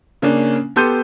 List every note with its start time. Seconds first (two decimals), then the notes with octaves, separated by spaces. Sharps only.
0.22 C#3 A#3 C#4 D4
0.76 B3 G4 A4 C6 G6 D#7